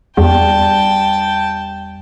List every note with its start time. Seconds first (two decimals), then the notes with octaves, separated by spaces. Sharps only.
0.17 E2 G3 G4 G5 A5